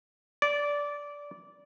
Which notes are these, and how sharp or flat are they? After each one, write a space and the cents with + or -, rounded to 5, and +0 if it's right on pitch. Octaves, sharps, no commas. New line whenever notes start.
D5 -15